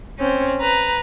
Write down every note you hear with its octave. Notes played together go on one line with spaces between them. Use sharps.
C4 C#4
B4 A#5